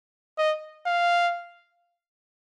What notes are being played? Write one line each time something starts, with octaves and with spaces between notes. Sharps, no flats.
D#5
F5